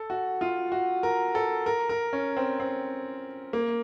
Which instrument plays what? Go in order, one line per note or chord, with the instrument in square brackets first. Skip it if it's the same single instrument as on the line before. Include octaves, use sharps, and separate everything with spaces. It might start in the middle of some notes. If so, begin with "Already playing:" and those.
Already playing: [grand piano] A4
F#4
F4
F#4
A#4
A4
A#4
A#4
C#4
C4
C4
A#3